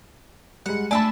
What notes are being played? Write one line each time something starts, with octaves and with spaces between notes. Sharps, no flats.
G3 G#3 F#5
A3 D4 D5 E5 G#5 A5 B5